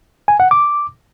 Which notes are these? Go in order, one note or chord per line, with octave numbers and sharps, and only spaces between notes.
G#5
F#5
D6